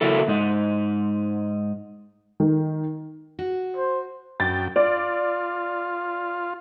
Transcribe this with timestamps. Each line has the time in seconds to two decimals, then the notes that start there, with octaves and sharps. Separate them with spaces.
0.01 C#3 F#3 A#3 E4 A4
0.28 G#2 D#4
2.40 D#3
3.39 F#4
3.77 C5
4.40 F#2 G5 A6
4.76 F4 D5